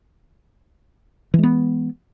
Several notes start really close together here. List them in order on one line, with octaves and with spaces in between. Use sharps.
E3 G#3 B3